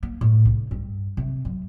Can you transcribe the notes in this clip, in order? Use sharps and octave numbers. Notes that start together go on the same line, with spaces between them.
A#3
A2
C2
G2
C3
F#2